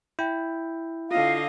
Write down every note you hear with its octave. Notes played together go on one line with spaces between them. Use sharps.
E4 G5 G6
D3 F4 D#5 F5